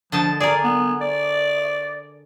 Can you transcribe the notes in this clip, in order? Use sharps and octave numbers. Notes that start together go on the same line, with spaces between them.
D3 F3 D#5 A5
G#4 A#4 D5
B3
D5